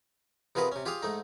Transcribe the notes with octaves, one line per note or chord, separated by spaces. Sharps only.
C3 B3 F4 G#4 A#4 B4
C3 C#4
F4 G4 G#4 C5 F5
G#2 A3 D#4